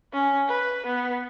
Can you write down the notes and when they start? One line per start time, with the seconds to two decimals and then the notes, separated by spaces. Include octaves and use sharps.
0.13 C#4
0.49 B4
0.86 B3